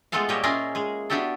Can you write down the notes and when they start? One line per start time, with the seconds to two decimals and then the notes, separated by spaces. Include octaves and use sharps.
0.12 G#3 A3 B3 F4 A4 F5
0.29 A#2 G3 A#3 G4 C#5 D#5
0.43 C#4 E4 F4 G#4 A#4 D#5
0.75 G#3 G#4
1.10 B3 D4 E4 F#4 G4 A4